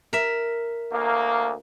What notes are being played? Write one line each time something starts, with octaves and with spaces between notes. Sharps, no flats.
A#4 E5
D2 A#3